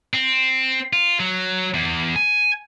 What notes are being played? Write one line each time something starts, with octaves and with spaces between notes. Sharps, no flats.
C4
F4
F#3
E2
G#5